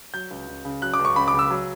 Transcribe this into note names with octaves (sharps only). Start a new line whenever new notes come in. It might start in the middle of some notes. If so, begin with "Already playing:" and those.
F#3 G6
C#2
C#2
C#3
F#3 F#6
D6
C#2
C#6
C#2 B5
D6
C#3
E6
F#3